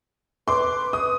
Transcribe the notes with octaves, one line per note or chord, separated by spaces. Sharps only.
B4 C6 D6
D#6